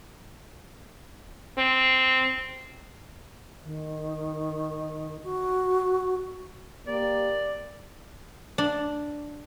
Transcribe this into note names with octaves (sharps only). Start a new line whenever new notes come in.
C4
D#3
F#4
A#3 G4 D5
D4